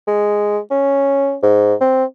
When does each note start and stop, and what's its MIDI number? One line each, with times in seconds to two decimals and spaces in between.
0.07 0.59 56
0.71 1.36 61
1.43 1.74 44
1.81 2.04 60